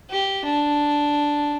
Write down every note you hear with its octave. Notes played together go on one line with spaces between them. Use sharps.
G4
D4